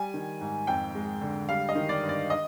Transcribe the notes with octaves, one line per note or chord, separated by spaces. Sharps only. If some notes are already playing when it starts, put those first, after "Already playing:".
Already playing: G3 G#5
D#3
G#2
F2 G5
G#3
D3
G3 F5
D#5
D#3
D5
G2
D5
D#5